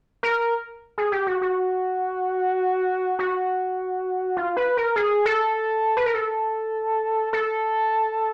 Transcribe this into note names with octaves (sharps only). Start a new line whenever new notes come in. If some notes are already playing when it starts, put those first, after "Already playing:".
A#4
G#4
G4
F#4
F#4
F#4
F4
B4
A#4
G#4
A4
B4
A#4
A4
A4